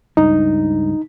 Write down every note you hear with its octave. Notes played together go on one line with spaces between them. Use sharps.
C#2 G2 D#4